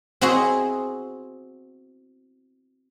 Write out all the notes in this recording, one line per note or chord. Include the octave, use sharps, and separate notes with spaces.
C4 E4 F#4 G#4 D#5